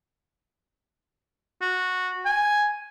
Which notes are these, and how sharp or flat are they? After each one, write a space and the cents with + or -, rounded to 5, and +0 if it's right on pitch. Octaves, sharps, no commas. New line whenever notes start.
F#4 -10
G#5 +0